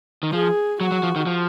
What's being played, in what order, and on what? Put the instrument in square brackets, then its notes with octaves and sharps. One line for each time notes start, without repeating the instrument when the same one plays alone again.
[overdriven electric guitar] D#3
[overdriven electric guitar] F3 [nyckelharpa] G#4
[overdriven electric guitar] F#3 [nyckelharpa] F#4
[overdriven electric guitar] F#3
F3
D#3
F3